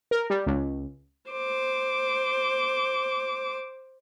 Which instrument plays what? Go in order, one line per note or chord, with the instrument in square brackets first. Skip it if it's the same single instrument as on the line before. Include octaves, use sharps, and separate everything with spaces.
[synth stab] A#4
G3
C#2
[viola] C5 D6